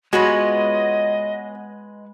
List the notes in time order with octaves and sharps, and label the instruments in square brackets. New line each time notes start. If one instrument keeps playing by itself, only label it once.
[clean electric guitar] G#3 [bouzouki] B3 F4 C#5 [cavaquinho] F#4 B4 B5 [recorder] D#5